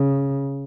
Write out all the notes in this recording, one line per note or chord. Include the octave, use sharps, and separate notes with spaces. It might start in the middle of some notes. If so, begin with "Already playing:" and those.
Already playing: C#3